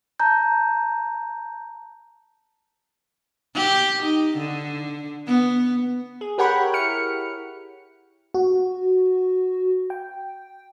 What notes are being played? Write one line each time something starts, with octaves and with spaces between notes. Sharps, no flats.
A5 A#5 G6
G4
D#4
D3
B3
G#4
G4 A#4 C#5 F#5 G5 B5
E4 F6 C#7
F#4
G5